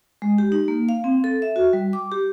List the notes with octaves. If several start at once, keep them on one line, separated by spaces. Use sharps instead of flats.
G#3
G4
D#4
A#3
F5
C4
A4
E5
F#4
G3
D6
G4